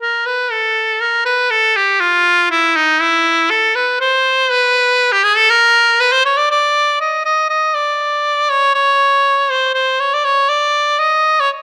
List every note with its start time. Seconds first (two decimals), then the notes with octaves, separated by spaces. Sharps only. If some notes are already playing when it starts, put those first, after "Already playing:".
0.01 A#4
0.26 B4
0.52 A4
1.01 A#4
1.25 B4
1.51 A4
1.77 G4
2.00 F4
2.51 E4
2.76 D#4
3.01 E4
3.50 A4
3.75 B4
4.01 C5
4.51 B4
5.12 G4
5.24 G#4
5.37 A4
5.50 A#4
6.00 B4
6.12 C5
6.25 C#5
6.37 D5
6.51 D5
7.01 D#5
7.25 D#5
7.50 D#5
7.75 D5
8.50 C#5
8.75 C#5
9.50 C5
9.74 C5
10.00 C#5
10.14 D5
10.25 C#5
10.49 D5
10.99 D#5
11.40 C#5